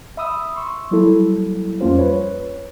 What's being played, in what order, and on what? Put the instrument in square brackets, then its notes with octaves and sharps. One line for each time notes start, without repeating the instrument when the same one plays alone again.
[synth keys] E5 B5 D#6 E6
C6 C#6 E6
F#3 G3 A#3 E4 A4
F2 G3 A#3 C#4 F4 C5
B4 C#5